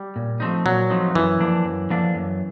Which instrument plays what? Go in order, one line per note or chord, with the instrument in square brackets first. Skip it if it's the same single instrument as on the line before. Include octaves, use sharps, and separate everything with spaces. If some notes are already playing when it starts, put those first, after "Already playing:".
Already playing: [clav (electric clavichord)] G3
[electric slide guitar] A#2
F3 A3 C4 D#4
[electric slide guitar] A#2 [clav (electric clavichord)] F#3
[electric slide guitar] F3 A3 C4 D#4
[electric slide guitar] F#2 [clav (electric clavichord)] E3
[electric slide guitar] D3 F3 A#3 D4
F#2
D3 F3 A#3 D4
F#2